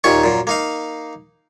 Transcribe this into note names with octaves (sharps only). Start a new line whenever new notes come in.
D#2 A#2 D#3 C#4 C#6
F#2 A#2
A#3 D#4 F5